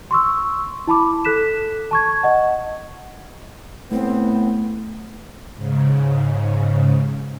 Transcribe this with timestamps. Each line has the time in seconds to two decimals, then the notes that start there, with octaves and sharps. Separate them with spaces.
0.11 C6 C#6 E6
0.87 E4 A5 B5 D6
1.25 A4 F#6 B6 E7
1.91 A5 C#6 G#6
2.23 D#5 F#5
3.91 A2 A3 B3 C4
5.56 G#2 C#3